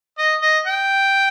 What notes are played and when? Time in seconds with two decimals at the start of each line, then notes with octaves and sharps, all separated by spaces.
0.18 D#5
0.42 D#5
0.66 G5